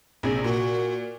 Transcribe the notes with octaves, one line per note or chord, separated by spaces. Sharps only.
A#1 C3 G#4
A#2 F#4